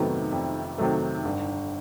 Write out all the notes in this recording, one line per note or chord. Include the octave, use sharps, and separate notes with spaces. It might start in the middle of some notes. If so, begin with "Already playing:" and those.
Already playing: F2 C3 D#3 F#3 A3 B3
F2
C3 D#3 F#3 A3
G1